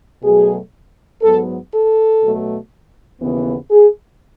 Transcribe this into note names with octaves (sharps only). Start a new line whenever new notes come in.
B2 F#3 A3 G#4
G#2 F#3 B3 A4
A4
B2 F#3 A3
D#2 C#3 E3 B3
G#4